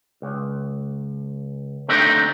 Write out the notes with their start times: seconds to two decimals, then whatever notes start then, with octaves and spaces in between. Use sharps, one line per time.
0.22 C#2
1.88 D3 A3 C4 D4 D#4 G4